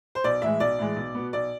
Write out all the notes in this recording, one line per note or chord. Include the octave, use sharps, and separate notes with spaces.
C5
B1 D5
A2 E3 G#3 E5
B1 D5
A2 E3 G#3
B1
B2 B3
B1 D5